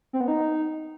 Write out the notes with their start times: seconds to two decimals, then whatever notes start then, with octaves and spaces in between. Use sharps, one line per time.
0.13 C4
0.21 B3
0.28 D#4